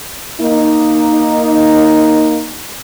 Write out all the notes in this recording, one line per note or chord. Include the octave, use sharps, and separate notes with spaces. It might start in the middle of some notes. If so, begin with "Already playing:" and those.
A#3 D#4